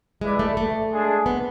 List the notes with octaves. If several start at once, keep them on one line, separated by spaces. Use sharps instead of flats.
G#3 E4 B4 D5
A3
A3
G#3 D4 G#4
B3